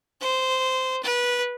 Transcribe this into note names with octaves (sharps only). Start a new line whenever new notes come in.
C5
B4